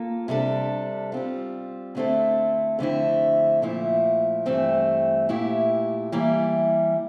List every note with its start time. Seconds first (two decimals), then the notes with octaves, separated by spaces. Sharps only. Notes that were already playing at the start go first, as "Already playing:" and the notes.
Already playing: A#3 F4 A4
0.28 C3 G3 D4 A4
1.12 G3 C4 F4
1.95 D3 A3 C4 E4 A4
2.79 F2 D3 A3 C4 E4
3.62 A#2 F3 A3 E4
4.46 G2 E3 A3 C4
5.29 A#2 A3 E4 G4
6.12 E3 G3 A#3 E4